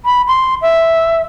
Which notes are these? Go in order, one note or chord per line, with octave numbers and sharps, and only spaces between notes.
B5
C6
E5